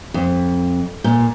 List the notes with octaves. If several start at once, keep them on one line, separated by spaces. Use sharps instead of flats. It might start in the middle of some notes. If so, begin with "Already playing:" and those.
F2
A#2